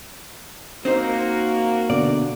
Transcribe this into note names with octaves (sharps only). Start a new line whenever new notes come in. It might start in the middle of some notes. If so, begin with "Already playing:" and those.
A#3 C4 D#4 F#4 C5
B2 D3 D5